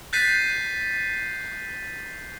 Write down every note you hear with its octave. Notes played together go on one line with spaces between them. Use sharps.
F#6 G6 A6 B6 C7 D#7